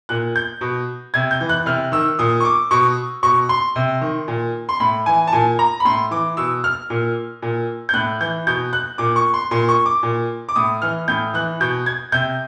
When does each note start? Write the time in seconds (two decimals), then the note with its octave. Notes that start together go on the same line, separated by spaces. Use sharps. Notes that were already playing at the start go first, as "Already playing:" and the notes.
0.09 A#2 F#6
0.36 G6
0.61 B2
1.14 C3 G#6
1.31 G6
1.41 E3
1.49 F#6
1.66 C3 F6
1.92 D#3 E6
2.19 A#2 D#6
2.40 C#6
2.45 D6
2.71 B2 C#6
3.23 B2 C#6
3.49 C6
3.76 C3
4.01 D#3
4.28 A#2
4.69 C6
4.80 A2 B5
5.06 E3 G#5
5.27 A5
5.33 A#2 G#5
5.59 A#5
5.80 B5
5.85 A2 C6
6.11 E3 D6
6.37 B2 E6
6.64 F6
6.90 A#2
7.42 A#2
7.89 G6
7.94 A2 F#6
8.20 E3 G6
8.47 B2 G6
8.73 F#6
8.98 A#2 D6
9.16 C#6
9.34 C6
9.51 A#2 C6
9.69 C#6
9.86 D6
10.03 A#2
10.49 D6
10.55 A2 D#6
10.82 E3 F6
11.08 A2 G6
11.34 E3 F#6
11.60 B2 G6
11.86 G#6
12.12 C3 G6